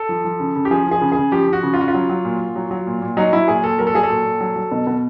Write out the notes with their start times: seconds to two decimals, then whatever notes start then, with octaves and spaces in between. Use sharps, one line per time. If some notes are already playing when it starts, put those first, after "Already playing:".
Already playing: A4
0.09 F3
0.25 F3
0.40 C#3
0.55 C#3
0.65 G4
0.71 F3 G#4
0.87 F3 G#4
1.01 C#3
1.12 C#3 G#4
1.32 F3 G4
1.47 F3
1.53 F#4
1.63 C#3
1.74 F4
1.79 C#3 F#4
1.88 F4
1.94 F#3
2.09 F#3
2.25 A#2
2.40 A#2
2.56 F#3
2.71 F#3
2.87 A#2
3.02 A#2
3.17 F#3 D#4
3.33 F#3 E4
3.48 A#2 G#4
3.64 A#2 A4
3.79 F#3 A#4
3.87 A4
3.94 F#3 G#4
4.03 A4
4.10 A#2
4.25 A#2
4.41 F#3
4.56 F#3
4.72 B2
4.87 B2